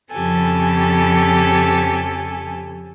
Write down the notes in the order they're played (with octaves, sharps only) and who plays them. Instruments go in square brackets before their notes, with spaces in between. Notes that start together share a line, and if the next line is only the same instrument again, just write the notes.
[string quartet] F2 C#3 F3 G4 A4 G#5